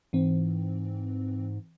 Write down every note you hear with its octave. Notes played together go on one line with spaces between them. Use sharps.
G#2 E3 C4